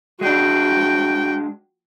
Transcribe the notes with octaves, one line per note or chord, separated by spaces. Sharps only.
G#3 D4 F#4 G5